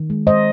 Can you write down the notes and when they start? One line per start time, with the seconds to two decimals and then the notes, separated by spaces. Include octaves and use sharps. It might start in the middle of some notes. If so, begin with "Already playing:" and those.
Already playing: D#3
0.10 G#3
0.27 G#3 C5 D#5